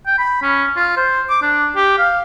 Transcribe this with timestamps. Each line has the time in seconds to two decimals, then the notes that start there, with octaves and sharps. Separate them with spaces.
0.06 G5
0.19 B5
0.42 C#4
0.76 F4
0.97 C5
1.29 D6
1.42 D4
1.76 G4
1.98 F5